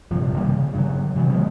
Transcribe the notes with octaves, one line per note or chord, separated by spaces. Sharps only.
A#1 G2 C3 F3
C3 D#3 G3 A#3
C#3
G2 C#3 F#3
C3 E3 F#3 G3
D#3 F3 G#3 B3